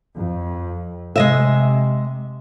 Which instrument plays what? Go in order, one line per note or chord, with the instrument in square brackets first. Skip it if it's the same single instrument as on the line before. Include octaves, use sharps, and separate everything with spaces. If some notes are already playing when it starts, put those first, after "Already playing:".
[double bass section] F2
[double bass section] C3 [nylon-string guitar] G#3 D#5 E5